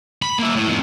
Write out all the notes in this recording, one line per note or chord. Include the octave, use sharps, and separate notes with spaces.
B5
A#3 E5
A2
F2 D#3